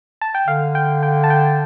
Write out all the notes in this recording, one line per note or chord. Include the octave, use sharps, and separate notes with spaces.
A5
G5
D3 F5
G5
G5
A5
G5